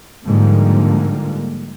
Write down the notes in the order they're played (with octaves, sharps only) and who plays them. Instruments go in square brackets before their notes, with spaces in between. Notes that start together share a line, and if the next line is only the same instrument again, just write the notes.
[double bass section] G#2 D3 F3 G3 A#3